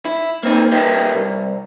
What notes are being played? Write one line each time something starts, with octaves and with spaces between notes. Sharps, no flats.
E4
A#3 C4 D#4
G4 A#4 B4 D#5 E5 G5
C2